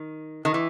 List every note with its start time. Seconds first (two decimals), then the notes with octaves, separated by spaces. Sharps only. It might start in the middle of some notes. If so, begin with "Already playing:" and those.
Already playing: D#3
0.45 D#3
0.54 E3